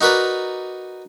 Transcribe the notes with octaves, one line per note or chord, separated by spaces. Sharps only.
D#4 F#4 A#4 B4 D5